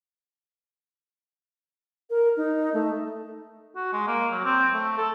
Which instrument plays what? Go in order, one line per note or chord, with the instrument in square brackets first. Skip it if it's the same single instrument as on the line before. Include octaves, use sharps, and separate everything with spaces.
[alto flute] A#4
D#4
A3
[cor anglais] F#4
G#3
A#3
F#3
C4
A3
A4